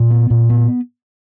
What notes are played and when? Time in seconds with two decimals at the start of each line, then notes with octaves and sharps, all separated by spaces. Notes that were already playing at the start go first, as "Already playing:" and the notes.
Already playing: A#2
0.10 B3
0.30 A#2
0.50 B3